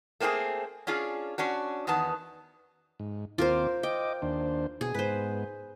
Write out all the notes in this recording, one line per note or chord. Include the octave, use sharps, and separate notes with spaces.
A3 A#3 C4 G4 G#4
C#4 D4 F4 G#4
C#4 D4 F#4
E2 D#3 B3 A5
G#2
D#2 C4 F4 A#4 C5 D6
D#5 G5 D6
D#2 D4 C5
B2 G#4
G#2 B3 B4 C5